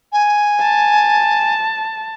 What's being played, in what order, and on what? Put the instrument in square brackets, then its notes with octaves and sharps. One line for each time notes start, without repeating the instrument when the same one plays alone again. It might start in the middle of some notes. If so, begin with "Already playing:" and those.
[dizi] G#5
[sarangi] A5